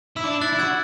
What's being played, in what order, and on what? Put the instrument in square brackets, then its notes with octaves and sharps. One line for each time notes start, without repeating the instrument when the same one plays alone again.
[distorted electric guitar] E4 [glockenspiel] E6
[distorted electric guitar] D4 [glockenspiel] D6
[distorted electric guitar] E4 [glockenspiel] F#6 A6
[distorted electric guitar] E4
[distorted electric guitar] F#4 [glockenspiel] E6 G#6